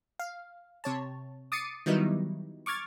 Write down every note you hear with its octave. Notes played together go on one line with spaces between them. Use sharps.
F5
C3 C#5 A5
D6 D#6 A6 C7 C#7 D#7
D#3 F#3 G3 B3 D#4 E4
C#6 D6 F6 G#6 A6